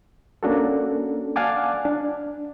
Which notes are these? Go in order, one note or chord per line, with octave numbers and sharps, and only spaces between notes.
A#3 C#4 D4 F#4 A4
D5 F5 F#5 G#5 A5 D6
D4